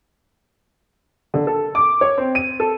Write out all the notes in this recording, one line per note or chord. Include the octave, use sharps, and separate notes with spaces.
D3
A4
D6
C#5
C4
D#7
A4